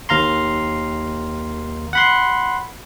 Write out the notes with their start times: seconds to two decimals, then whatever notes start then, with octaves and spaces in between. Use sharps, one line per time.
0.09 D#2 F5 A#5 C6
1.93 F#5 B5 C6